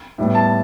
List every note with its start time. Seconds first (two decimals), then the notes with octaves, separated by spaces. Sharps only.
0.18 A2 G3 B3
0.35 A5